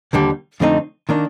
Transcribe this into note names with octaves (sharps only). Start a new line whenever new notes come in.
D#2 D3 G3
F2 D3 A3 C4 D#4
D#3 A#3 D4